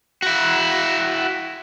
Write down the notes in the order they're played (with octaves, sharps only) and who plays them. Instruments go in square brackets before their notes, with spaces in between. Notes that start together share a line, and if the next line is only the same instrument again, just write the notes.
[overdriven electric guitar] E4 F#4